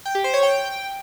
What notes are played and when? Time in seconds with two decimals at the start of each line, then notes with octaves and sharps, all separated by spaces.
0.06 G5
0.15 G4
0.24 C5
0.34 C#5
0.43 G5